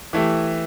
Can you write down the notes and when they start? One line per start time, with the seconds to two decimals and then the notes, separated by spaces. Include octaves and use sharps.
0.13 E3 A3 E4 G4